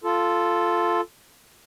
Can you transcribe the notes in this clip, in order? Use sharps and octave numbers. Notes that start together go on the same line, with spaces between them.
F4 A4